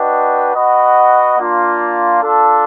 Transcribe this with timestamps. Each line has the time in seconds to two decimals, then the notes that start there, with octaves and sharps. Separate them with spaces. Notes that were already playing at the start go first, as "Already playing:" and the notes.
Already playing: D4 F#4 B4 D#5 G5
0.54 F#4 B4 D#5 F#5
1.38 A#3 D4 F4
2.23 D4 F4 A4